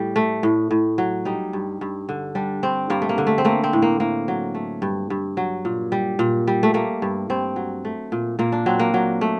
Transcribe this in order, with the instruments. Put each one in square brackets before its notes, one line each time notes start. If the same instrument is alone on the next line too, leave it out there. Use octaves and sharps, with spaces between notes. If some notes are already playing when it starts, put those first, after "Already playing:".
Already playing: [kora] A2 G3
A3
A2
A2
F#3
G3 D#4
G2
G2
D3
G3 D4
G2 C4
G2 A#3
A3
A#3
D3
A3
C4
A3 A#3
C4
A2
A#3
A2 A#3
F#3
A3
G2
G2
F#3
A#2
G3
A#2
G3
A3
A3 A#3
G2
G2 C4
F#3
A3
A#2
A#2 A#3
D4
F#3 C4
A#3
F#3
A3